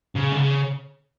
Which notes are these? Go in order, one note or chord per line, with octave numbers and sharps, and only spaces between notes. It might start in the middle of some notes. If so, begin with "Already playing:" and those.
C#3
D3
C#3